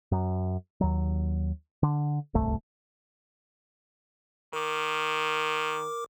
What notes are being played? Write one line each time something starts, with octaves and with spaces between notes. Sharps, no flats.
F#2
D#2 F#3
D3
D1 G1 C2 A3
D#3 A#4 D6